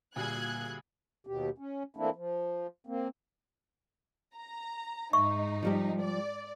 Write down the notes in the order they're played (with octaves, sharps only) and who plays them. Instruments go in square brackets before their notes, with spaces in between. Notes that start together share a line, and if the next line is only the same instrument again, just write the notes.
[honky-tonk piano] D2 G3 G#4 [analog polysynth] A#2 A#3 F5 [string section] F#6 G#6
[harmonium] D#2 B2 G4
C#4
E3 A3 A#3 C4 D4 E4
F3
A#3 C4
[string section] A#5
[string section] G#2 D#4 [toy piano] E5 C#6
[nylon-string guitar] F3 G3 G4
[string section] D5